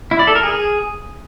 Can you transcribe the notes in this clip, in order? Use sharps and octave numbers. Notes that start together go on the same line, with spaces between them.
E4
D5
A4
A#4
G#4